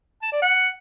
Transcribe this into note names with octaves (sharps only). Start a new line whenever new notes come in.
A5
D5
F#5